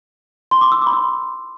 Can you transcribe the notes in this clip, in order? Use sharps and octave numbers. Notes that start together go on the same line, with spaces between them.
C6
D6
E6
D6
B5
C6